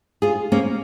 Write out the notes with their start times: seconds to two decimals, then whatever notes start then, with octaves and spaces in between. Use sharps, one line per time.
0.22 F4 G#4
0.52 A#3 C#4